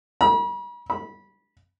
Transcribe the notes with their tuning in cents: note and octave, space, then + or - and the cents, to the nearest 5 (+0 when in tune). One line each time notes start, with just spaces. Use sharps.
B5 -45
B5 -20